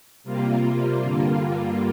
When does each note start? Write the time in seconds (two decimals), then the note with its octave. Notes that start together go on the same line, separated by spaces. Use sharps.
0.24 C3 G3 A#3 F4
1.02 G2 D3 G3 A#3 F4